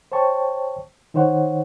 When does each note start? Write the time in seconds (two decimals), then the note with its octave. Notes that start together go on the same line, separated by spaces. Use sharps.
0.12 C5 C#5 G5 A5 C#6
1.14 D#3 D#4 C5 C#5 F#5